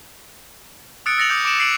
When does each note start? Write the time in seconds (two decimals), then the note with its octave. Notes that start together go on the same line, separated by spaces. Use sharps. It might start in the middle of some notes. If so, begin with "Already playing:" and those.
1.06 D#6 E6 F#6 A6 C#7 D7
1.18 E6 A6 A#6 C#7 F7 F#7
1.29 D6 D#6 G6 A6
1.45 D6 D7 E7 F#7
1.59 D6 A6 C7 D7 D#7 F#7